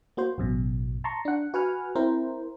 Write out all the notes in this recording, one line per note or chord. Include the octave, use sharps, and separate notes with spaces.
A#3 F#4 C5
A1 F#2 B2
A5 A#5 C6 C#6
D4 F#5
F#4 B4 F#5 G#5 F6
C4 E4 A#4 C5